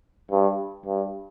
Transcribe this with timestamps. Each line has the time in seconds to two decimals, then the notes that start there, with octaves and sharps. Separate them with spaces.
0.31 G2
0.86 G2